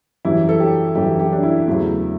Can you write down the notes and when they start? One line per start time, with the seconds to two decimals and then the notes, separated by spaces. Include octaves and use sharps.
0.25 F#2 E3 G3 E4
0.49 A4
0.60 G4
0.95 F#2 E3 G3 G4
1.19 G4
1.33 D4
1.43 E4
1.67 E2 C#3 F#3 A3